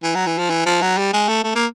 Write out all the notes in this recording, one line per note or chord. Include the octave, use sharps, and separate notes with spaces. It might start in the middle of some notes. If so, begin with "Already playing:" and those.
E3
F#3
E3
F3
E3
F3
F#3
G3
G#3
A3
A3
A#3